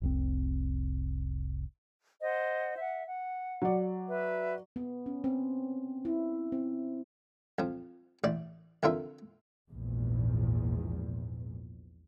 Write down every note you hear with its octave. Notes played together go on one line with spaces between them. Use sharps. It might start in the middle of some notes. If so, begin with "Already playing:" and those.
F1 C2 C4
C5 D#5 F#5
E5 F#5
F#5
F#3 D5
B4 E5
B3
C#4
C4
E4
C4
F2 F3
A1 D5
F2 D3 F4 A#4 E5
A#1 E2 G#2